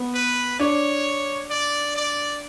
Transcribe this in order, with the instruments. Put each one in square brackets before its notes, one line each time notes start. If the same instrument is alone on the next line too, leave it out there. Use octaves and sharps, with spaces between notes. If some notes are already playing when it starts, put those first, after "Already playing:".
Already playing: [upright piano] B3
[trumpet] B4
[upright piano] D4 [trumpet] C#5
[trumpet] D5
D5